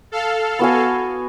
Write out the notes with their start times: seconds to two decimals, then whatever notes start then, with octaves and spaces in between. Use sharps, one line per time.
0.12 A4 F5
0.59 B3 F#4 G#5